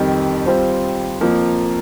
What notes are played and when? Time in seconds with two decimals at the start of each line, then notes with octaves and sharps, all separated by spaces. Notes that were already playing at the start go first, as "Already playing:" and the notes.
Already playing: F2 D#3 G3
0.46 G3 C4 F4 C5
1.21 F2 F3 A#3